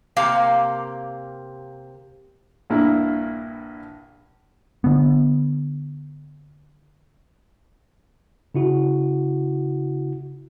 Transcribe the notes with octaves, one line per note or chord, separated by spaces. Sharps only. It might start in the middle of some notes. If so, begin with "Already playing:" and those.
C3 A#3 F5
A#1 G2 A#3 E4
D3 B3
C#3 E4 F#4